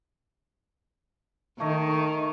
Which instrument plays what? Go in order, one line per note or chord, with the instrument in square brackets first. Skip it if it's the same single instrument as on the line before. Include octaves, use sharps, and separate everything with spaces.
[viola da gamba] D#3 [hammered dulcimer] A3 C#5 D#5